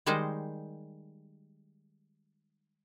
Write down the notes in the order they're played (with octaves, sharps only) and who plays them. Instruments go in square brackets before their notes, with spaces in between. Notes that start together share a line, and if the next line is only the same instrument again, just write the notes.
[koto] D#3 G3 G#3 D#4 C5